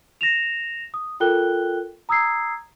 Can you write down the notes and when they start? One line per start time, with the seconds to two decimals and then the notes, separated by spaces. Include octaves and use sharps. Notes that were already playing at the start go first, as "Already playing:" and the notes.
0.21 A#6 E7 F7
0.94 D#6
1.20 F4 A4 A#4 G5 F#6 G7
2.09 A#5 D#6 E6 G#6 C7